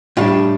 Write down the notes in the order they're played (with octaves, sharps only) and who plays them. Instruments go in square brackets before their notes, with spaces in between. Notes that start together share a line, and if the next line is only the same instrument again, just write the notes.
[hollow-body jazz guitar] A2 G3 D4 F4